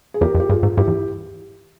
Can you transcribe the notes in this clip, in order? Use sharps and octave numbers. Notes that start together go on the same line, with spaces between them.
G#4
E2 G4 A#4
F2
G4
G2 F4 G#4
G#2
G2 E4 G4
E2